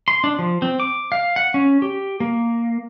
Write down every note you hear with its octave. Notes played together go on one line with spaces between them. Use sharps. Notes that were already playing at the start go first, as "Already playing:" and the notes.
C6
D4
F3
C4
D6
F5
F#5
C#4
G4
A#3